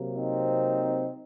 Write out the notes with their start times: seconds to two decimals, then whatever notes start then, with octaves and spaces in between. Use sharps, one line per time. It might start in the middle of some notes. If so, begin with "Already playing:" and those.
Already playing: C3 F#3 A#3
0.17 C4 D#4